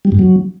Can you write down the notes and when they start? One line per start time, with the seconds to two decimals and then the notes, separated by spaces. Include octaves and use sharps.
0.05 G3
0.12 G2
0.19 F#3